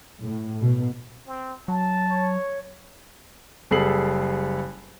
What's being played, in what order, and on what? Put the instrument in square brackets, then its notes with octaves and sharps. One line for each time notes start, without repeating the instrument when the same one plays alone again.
[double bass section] A2
B2
[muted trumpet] C4
[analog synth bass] F#3 [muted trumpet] A5
[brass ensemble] C#5
[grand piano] F#1 G3 G#4 A4 C7 F#7